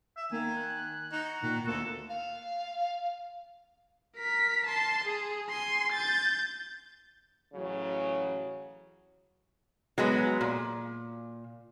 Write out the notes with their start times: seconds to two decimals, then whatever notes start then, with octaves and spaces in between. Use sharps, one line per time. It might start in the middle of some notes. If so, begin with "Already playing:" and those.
0.17 E5
0.32 D#3 A#3 G#5
0.56 F#6
1.12 D#4 F#4
1.43 A#2 D#3
1.67 D2 A#3 A4
2.09 F5
4.16 A#4 B6
4.66 A5 C6
5.05 G#4
5.50 G#5 C6
5.93 G6 A6
7.54 A1 C#3 F#3
9.98 F#3 G#3 B3
10.41 A#2